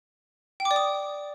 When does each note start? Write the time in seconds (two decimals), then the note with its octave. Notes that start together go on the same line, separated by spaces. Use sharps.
0.60 G5
0.65 D6
0.71 D5
0.76 D#6